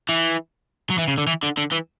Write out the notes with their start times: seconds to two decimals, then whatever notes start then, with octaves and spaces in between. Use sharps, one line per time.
0.09 E3
0.90 F#3
0.98 E3
1.08 C#3
1.18 D3
1.27 E3
1.43 D3
1.57 D3
1.72 E3